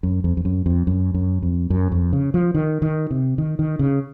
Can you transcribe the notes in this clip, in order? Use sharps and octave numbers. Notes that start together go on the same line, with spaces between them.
F#2
F2
F2
F#2
F2
F#2
F#2
F2
F#2
F2
C#3
F3
D#3
D#3
C3
D#3
D#3
C#3